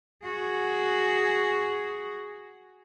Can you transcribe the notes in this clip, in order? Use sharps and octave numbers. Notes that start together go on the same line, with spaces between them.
F#4 G#4